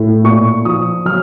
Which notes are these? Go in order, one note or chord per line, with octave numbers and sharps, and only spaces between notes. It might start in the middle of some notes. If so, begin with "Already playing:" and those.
Already playing: A2
A#2 C#6
F3 D#6
F#3 F6